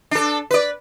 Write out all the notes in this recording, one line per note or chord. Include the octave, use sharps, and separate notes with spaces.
D4 A4
B4 D5